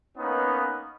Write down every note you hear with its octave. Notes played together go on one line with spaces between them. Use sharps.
A#3 B3 C#4 D#4 B4